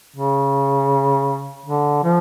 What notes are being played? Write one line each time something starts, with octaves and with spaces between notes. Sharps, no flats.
C#3
D3
F3